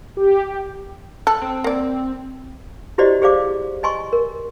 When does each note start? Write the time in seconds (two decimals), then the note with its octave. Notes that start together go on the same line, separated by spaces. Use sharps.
0.17 G4
1.27 A4 F#6
1.42 C4
1.64 A#3 D5
2.98 E4 F#4 G4 C5 D5 D#5
3.22 G4 G#4 C5 D5 F5 D6
3.83 D#5 G#5 C6 C#6
4.13 A#4